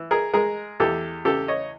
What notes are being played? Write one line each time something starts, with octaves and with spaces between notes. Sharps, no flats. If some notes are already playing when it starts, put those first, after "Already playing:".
Already playing: E3
G#4 A#4
G#3 G#4 A#4
E2 G4 A4
C#3 G4 A4
C#5 D#5